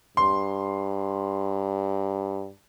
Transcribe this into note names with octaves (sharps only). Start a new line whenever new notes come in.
G2 C6